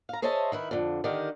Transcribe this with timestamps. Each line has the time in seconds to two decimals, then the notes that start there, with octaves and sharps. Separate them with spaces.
0.09 F5 A#5
0.22 G#4 C5 C#5 D#5 E5 A5
0.52 D#3 E4 B4
0.71 F2 D3
1.04 D3 D#3 G4 A#4